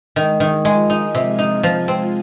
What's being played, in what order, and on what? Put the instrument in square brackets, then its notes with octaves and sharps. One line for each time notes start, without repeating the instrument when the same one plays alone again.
[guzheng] D#3 [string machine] G#3 G#4
[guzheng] D#3
[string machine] F3 F4 [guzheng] G#3
[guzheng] D#4
C3
D#4
F3
C4